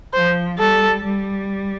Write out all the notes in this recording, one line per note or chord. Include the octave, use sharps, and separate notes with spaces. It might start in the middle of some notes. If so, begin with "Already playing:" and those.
F3 C5
G3 A4
G3